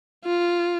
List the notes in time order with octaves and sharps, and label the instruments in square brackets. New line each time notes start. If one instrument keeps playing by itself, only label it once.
[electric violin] F4